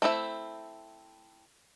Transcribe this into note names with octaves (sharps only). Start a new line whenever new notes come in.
A3 C4 E4 E5